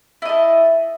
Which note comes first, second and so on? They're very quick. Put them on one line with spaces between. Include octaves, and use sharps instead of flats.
E4 D#5 A4